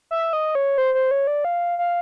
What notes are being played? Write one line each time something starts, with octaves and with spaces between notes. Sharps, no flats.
E5
D#5
C#5
C5
C5
C#5
D5
F5
F5